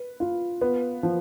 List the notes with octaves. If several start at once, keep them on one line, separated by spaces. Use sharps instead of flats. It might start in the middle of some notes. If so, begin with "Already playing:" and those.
Already playing: B4
F4
B3
F3